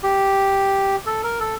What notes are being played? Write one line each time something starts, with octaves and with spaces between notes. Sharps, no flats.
G4
A4
A#4
A4